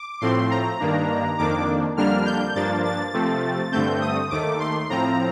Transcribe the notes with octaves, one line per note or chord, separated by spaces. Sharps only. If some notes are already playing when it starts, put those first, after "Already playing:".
Already playing: D6
A2 F3 A3 C4 C6
A#5
G2 D#3 A#3 D4
F2 D#3 A#3 D4 D6
F2 D3 G3 A#3 D4 F6
G6
G2 F3 A#3 D4 A6
A6
C3 F3 A3 C4
G2 D3 A3 C4 G6
D#6
D#2 D#3 A3 D6
C6
A2 F3 C4 A#5